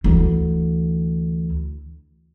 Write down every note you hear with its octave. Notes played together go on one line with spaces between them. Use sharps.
D2 E3